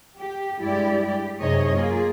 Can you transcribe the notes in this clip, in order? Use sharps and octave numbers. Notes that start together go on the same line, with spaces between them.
G4
G2 G#3 E4 G4 D5
G4
F#2 C3 D#4 G#4 C#5 D#5
A#3 F4 G#4